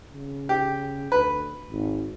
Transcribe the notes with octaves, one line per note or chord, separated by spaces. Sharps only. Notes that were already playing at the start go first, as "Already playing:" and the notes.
C#3
G4
D2 B4
G#1